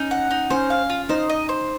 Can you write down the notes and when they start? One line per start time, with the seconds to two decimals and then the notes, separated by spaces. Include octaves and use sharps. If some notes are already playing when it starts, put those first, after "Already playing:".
Already playing: C#4 D#4
0.11 F#5
0.31 D#4
0.50 C#4 C5
0.70 F5
0.90 F4
1.09 D#4 C5
1.30 D#5
1.49 C5